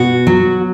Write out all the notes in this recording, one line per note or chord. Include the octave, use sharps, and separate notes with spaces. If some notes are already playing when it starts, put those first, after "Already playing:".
Already playing: B2 F#4
F#3